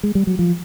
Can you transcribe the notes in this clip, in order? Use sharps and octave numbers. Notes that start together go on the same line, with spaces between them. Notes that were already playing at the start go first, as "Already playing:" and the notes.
G#3
G3
F#3
F3